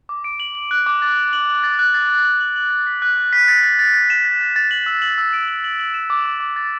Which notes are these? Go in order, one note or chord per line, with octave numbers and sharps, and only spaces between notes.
D6
D7
F#7
F#7
F#6
D6
A6
F#7
F#7
F#7
A6
F#6
A6
A6
F#7
F#7
F#7
A6
B6
F#6
D6
B6
A6
A6
A6
A6
E7
A6
A6
A6
F#7
E6
F#7
E6
D7
F#7
F#7
F#7
E7
D6
D6
D6
A6